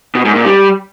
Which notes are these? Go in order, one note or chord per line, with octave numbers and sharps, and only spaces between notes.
B2
G#2
A#2
G3